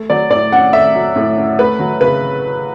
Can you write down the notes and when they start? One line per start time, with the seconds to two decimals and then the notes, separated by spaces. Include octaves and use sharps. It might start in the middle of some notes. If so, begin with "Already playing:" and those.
Already playing: A3
0.10 F#3 D5
0.30 A2 D5
0.52 C#4 F#5
0.73 A3 E5
0.95 F#3
1.16 A2
1.37 C#4
1.59 A3 B4
1.79 F#3
2.01 C#3 B4